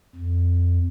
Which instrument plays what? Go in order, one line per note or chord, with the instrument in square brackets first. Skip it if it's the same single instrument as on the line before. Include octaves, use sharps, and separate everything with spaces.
[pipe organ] F2